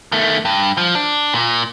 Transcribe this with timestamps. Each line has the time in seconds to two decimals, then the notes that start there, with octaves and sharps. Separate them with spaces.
0.12 D#3 A3
0.45 G2
0.77 F3
0.95 D4
1.35 A#2